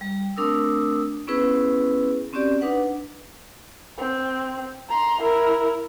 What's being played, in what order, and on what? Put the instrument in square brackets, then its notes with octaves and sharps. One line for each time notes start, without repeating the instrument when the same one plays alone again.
[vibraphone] G3
A3 C4 D4 A#4 D#6 E6
B3 C#4 E4 G#4 B4
C4 C#4 F#4 G4 D5
D4 D#4 B4 F#5
[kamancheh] C4
A#5 C6
E4 A#4